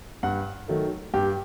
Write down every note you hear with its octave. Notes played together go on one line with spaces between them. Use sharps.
G2 F#5
D#3 F#3 A3
G2 G4